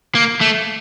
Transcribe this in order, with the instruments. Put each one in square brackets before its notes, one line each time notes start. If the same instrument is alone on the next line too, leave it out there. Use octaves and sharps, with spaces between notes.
[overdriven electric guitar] A#3
A3